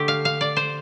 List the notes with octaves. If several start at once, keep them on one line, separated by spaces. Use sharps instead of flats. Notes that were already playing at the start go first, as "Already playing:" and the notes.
Already playing: D3 A3 G4
F5
F5
D5
C5